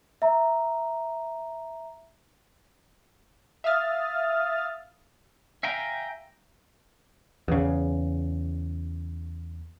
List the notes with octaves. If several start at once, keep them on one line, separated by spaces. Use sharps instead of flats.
E5 A#5
E5 F5 D#6 F6 A6
E5 F5 G5 G#5 A#5
E2 C#3